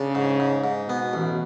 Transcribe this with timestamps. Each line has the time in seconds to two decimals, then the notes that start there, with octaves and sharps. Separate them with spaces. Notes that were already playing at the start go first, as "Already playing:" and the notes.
Already playing: C#3 D4
0.15 G#2
0.40 G#2
0.64 G#2
0.88 B2 B3
1.13 A1